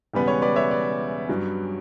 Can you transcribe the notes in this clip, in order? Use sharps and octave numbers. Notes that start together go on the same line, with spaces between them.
E1 E2 C#3 G3 B3 B4
C#5
B4 D5
C#5 E5
B4 D5
G2 F#3 C#4